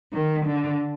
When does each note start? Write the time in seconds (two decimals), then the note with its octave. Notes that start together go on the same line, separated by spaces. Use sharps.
0.13 D#3
0.46 D3